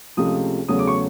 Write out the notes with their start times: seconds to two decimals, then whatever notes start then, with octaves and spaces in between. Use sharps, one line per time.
0.17 C#2 C3 F3 A3 D#6
0.68 E2 C#3 F#3 A3 D#6
0.79 D6
0.87 C#6